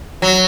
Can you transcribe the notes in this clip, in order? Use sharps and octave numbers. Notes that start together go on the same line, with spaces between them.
F#3